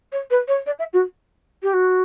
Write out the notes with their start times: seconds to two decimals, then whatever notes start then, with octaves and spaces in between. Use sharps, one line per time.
0.12 C#5
0.30 B4
0.48 C#5
0.66 D5
0.79 E5
0.93 F#4
1.63 G4
1.73 F#4